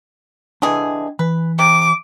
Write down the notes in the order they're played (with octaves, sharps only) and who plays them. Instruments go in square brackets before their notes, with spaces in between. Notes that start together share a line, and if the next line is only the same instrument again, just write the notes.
[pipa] D3 E3 G#4 [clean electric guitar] D4 D#5 G5
[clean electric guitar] E3 [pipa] B4
[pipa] C3 [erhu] D6